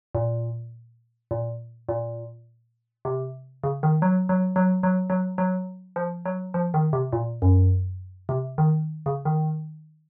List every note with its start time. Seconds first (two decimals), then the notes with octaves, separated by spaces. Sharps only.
0.15 A#2
1.31 A#2
1.89 A#2
3.05 C3
3.64 C#3
3.83 D#3
4.02 F#3
4.29 F#3
4.56 F#3
4.83 F#3
5.10 F#3
5.38 F#3
5.96 F3
6.25 F#3
6.54 F3
6.74 D#3
6.93 C3
7.13 A#2
7.42 F#2
8.29 C3
8.58 D#3
9.06 C#3
9.25 D#3